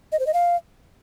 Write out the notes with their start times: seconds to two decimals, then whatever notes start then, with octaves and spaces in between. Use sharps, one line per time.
0.12 D#5
0.19 C5
0.26 D#5
0.34 F5